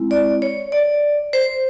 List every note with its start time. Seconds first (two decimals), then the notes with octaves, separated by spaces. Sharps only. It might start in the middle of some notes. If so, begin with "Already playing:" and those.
Already playing: G#3 C4 E4
0.11 D5
0.42 C#5
0.72 D5
1.33 C5